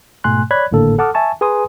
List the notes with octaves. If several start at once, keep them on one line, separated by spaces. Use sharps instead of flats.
G#2 B2 A3 G#5 C6 F#6
C#5 D5 B5 F#6 G#6
G#1 A2 D3 A#3 A4
A4 F#5 A5 D6 D#6 F6
E5 G#5 A5 C#6
G#4 B4 G#5 A#5 C6 D#6